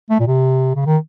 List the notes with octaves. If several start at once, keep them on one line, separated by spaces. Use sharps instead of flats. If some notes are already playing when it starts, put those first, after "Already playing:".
A3
A#2
C3
C#3
D#3